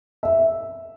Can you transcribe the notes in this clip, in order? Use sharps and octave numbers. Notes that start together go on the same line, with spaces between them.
E5